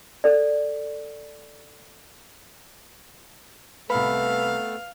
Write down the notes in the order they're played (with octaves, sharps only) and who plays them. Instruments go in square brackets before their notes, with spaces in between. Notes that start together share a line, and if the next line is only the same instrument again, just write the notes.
[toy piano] A4 D5
[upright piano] C2 B5 [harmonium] A3 B3 A4 [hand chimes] B4 [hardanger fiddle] F5